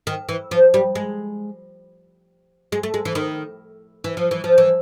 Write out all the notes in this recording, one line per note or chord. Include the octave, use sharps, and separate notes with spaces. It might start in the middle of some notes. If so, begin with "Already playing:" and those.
D#3
E3
F3
G3
G#3
G#3
A3
G#3
E3
D#3
E3
F3
E3
F3
E3